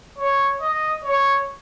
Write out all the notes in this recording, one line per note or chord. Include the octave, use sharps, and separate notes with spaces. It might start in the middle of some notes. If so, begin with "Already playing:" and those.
C#5
D#5
C#5